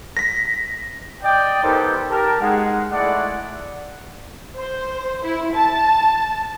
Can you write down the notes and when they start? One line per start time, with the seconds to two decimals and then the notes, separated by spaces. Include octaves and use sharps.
0.17 A#6 B6
1.23 D5 D#5 G5
1.63 B3 D#4 G4 A4 A#4 C5
2.10 G4 A#4 A5
2.40 G#3 D#4 F#5
2.90 G#3 A3 E4 D5 F#5
4.56 C5
5.24 E4
5.55 A5